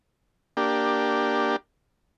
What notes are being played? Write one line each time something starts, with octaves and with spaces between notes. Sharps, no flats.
A#3 D4 G4